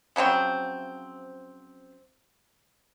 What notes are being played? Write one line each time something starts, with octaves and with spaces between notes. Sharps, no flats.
C#3 F3 F#3 C4